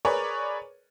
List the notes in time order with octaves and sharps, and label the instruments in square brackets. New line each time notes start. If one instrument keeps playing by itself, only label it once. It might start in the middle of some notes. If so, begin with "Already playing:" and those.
[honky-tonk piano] G#4 A#4 B4 C#5 D5